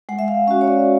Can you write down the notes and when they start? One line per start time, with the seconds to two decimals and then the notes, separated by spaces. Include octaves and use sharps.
0.09 G#3 F#5
0.19 E5
0.28 F5
0.47 C#4 E5
0.51 F#4
0.61 C#5
0.68 D5